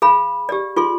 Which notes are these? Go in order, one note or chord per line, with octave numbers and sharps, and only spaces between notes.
G#4 F5 B5
G4 D5
F4 G#4 C6